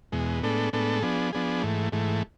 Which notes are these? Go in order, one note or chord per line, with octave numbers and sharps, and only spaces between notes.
E2 B2 G#3
A2 G#3 B3 D4 A4
A2 G#3 B3 D4 A4
F3 B3 D4 G#4
F3 B3 D4 G#4
G#2 E3 A3
G#2 E3 A3